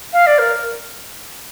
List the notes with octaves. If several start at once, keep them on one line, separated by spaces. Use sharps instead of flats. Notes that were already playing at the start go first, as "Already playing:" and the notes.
F5
D5
A#4